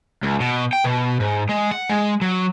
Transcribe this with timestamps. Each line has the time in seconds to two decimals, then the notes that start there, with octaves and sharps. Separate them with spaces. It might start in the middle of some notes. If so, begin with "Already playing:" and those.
0.23 C#2
0.40 B2
0.73 G5
0.84 B2
1.20 G#2
1.49 G#3
1.71 F#5
1.90 G#3
2.21 F#3